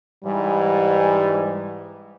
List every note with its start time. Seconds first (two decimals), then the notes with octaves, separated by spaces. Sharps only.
0.24 G#2 E3 G3